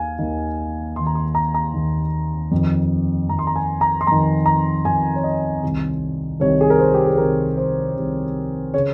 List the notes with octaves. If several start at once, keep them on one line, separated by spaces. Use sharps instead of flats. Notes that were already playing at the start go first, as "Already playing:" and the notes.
Already playing: D#2 D#3 F5 G#5
D#2 D#3
D#2 D#3 C6
A#5
C6
A#5
A#5
D#2 D#3
F2 D#3
F2 D#3 A#5
C6
A#5
G#5
A#5
C6
F2 D#3 A#5
A#5
F2 D#3 G#5
C#5
D#5
C2 C3 D#3
C2 C3 D#3 C#5
G#4
A#4
C5
G4
G#4
C2 C3 D#3 A#4
C5
C2 C3 D#3
C#3 C#5